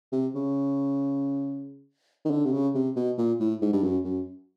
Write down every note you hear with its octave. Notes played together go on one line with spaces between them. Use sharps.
C3
C#3
D#3
D3
C3
C#3
C3
B2
A#2
A2
G#2
G2
F#2
F#2